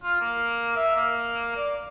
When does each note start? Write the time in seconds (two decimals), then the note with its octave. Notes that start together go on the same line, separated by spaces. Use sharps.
0.04 F4
0.21 A#3
0.76 E5
0.96 A#3
1.56 D5